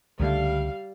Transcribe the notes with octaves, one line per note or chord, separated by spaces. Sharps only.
C#2 D3 G3 A3 F5